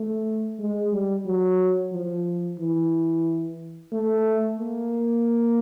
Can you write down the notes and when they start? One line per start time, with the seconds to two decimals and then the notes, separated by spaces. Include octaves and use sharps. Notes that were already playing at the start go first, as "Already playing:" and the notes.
Already playing: A3
0.60 G#3
0.93 G3
1.26 F#3
1.92 F3
2.59 E3
3.92 A3
4.59 A#3